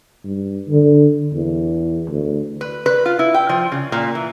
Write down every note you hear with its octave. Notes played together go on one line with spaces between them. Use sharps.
G2
D3
E2
D2
B4
B4
F4
E4
G5
F3
C#3
A#2
E3